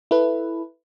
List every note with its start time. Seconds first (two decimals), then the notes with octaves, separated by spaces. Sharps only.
0.11 E4 A4 B4